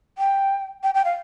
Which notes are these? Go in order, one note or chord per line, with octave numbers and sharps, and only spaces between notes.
G5
G5
G5
F5